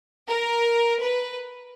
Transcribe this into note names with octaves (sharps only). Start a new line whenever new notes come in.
A#4
B4